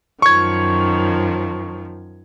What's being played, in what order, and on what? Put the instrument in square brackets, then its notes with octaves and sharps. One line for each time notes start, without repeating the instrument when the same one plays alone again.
[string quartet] F#2 D#3 F3 [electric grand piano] C#6 G#6